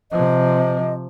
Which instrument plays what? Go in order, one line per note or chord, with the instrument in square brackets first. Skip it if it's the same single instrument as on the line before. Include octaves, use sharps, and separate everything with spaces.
[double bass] C3 F3 [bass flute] D#5